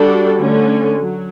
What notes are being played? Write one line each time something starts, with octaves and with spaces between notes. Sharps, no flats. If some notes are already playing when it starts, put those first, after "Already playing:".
Already playing: G3 D4 F#4 A4
D3 A3 C#4
F#3